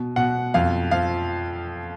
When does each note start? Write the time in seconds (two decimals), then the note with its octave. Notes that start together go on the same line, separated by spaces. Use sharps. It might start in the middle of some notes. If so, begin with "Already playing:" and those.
Already playing: B2
0.16 B2 F#5
0.54 F2 F5
0.91 F3 F5